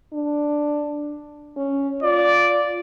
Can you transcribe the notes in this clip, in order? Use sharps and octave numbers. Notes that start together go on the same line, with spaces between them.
D4
C#4
F4 D5